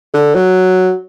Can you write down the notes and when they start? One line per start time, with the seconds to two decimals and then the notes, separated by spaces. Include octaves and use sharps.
0.14 D3
0.35 F#3